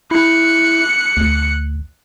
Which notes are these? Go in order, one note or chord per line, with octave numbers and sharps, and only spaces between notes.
E4 F#6 C#7
D2